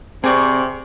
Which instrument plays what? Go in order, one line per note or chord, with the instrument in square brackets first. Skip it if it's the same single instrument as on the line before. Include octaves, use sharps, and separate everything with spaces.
[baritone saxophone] C3 [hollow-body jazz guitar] C4 [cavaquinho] G#4 D5 C#6